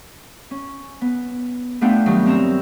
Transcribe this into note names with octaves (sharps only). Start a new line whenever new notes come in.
C#4
B3
A3 B3 D4 F4 F#5 G5
G2 D#3 F#3
C4 A#4 C#5 A#5 E6